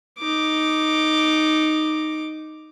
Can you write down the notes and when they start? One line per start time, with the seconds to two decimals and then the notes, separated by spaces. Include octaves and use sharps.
0.19 D#4 D6